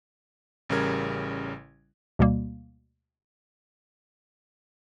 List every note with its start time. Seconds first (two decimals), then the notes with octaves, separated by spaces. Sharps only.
0.69 A1 C#3 G3 A#4 G#6
2.19 D2 B2 G3 A#3